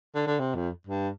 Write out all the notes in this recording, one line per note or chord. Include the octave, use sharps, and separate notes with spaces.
D3
D3
C3
F2
G2